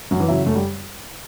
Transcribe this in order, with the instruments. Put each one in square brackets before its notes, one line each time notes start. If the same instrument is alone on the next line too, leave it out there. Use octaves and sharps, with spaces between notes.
[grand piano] F#2 [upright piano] F#3
[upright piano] E3
[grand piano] C#3 F#3 C#4 E4
[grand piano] F#2 [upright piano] A3
[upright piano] G3